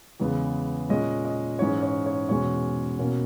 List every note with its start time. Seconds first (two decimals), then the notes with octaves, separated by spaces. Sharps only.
0.20 E2 C#3 G#3 B3
0.89 A#2 G#3 C#4 D#5
1.25 D#5
1.59 G#2 E3 G#3 C#4 C#5
1.83 C#5
2.06 C#5
2.29 E2 B2 G#3 C#4 C#5
2.99 B2 A#3 C#4